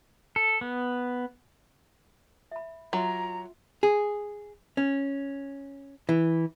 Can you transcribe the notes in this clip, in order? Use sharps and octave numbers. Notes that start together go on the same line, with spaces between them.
A4
B3
E5 B5
F#3 F4 E5 A#5 C6
G#4
C#4
E3